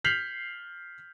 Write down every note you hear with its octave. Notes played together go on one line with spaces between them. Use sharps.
F6 G6 B6 C7 F7 F#7